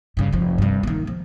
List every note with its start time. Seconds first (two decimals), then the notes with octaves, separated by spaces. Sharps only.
0.17 G2 C#3
0.33 F1 F3
0.58 G2 C3
0.83 D#3 A#3
1.07 F3